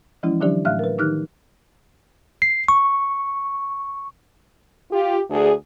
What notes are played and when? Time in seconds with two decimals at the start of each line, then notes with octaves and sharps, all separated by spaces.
0.23 E3 F3 G#3 C#4 E4
0.41 D3 E3 F#3 D4 G4 D5
0.65 A2 A3 E5 F5 F6 F#6
0.79 A#4 B4
0.98 D#3 F3 D#4 G4 F6 F#6
2.42 C7
2.68 C#6
4.91 F4 G4
5.30 D2 D4 G#4